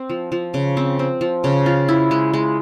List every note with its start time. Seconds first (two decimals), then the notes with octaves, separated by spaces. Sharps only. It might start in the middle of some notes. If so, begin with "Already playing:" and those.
Already playing: C4
0.10 F3
0.32 F3
0.54 C#3
0.77 C4
0.99 C4
1.21 F3
1.44 C#3
1.66 F4
1.89 E4
2.11 G#3
2.34 G#3